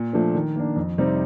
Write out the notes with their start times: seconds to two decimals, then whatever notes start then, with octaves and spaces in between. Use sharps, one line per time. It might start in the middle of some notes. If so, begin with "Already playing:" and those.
Already playing: A#2
0.13 F3 A3 D4
0.35 D#3
0.56 A#3 D4
0.76 F2
0.98 C3 G3 C4 D#4